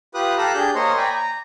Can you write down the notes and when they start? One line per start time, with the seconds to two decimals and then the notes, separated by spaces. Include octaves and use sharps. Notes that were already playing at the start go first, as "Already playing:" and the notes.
0.15 F4 G4 B4 D#6 F#6
0.38 G4 A4 F5 A#5 E6 F#6
0.55 D4 G4 G#4 G6
0.75 A#3 C5 C#5 D#5 C6
0.97 D5 G5 G#5 A#5 B5
1.13 A#5